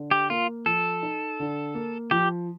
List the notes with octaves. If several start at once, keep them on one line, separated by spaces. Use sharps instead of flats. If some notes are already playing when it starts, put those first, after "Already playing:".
Already playing: D3
G4
A#3 F4
F3 A4
D#4
D3
A#3
F3 G4